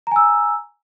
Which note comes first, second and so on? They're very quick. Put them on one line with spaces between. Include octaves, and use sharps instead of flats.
A#5 G#5 E6